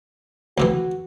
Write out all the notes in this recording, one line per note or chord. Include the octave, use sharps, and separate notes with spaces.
D2 C3 E3 F#4